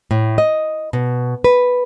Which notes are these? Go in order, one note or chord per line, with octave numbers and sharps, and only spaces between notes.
A2
D#5
B2
B4